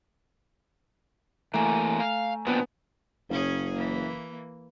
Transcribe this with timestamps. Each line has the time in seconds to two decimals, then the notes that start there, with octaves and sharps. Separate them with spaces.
1.54 E3 A3 A#3 G#5 A#5
2.00 F5
2.47 A#2 B3 C4 D4 B4
3.30 F#1 C#3 C#4 G#4
3.73 E3 A#3